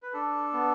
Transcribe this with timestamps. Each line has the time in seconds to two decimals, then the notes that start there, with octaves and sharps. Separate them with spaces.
0.03 B4
0.13 D4 A4
0.53 B3